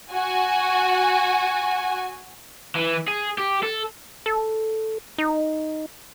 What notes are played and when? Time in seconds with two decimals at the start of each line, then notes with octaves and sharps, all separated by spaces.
0.12 F#4 G#5
2.76 E3
3.08 G#4
3.38 G4
3.63 A4
4.26 A4
5.18 D#4